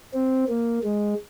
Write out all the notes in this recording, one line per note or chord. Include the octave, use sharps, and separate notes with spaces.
C4
A#3
G#3